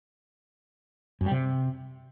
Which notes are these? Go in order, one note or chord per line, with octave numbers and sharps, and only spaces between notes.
F#2
G3
C3